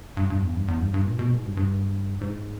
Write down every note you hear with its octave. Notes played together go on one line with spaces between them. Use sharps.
G2
G2
E2
G2
E2
G2
G2
A#2
B2
G#2
G2
G2
G#2